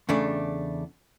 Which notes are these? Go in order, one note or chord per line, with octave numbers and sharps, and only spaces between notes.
E2 C#3 A3 D4